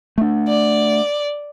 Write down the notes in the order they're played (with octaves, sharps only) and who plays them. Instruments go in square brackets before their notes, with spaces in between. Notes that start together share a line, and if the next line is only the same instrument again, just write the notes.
[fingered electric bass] A3 D4
[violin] D5